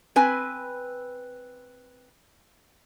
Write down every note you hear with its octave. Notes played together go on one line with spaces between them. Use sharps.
C4 B4 G#5